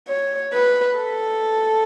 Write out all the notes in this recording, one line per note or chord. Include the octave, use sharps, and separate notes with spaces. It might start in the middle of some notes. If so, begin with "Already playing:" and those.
C#5
B4
A4